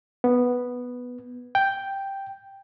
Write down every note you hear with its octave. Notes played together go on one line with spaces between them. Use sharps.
B3
G5